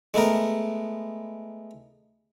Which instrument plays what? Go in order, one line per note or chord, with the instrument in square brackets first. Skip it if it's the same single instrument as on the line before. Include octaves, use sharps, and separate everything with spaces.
[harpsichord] G#3 A3 B3 A#4